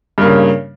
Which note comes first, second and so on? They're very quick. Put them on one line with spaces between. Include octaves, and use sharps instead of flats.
G2 A#3 C#3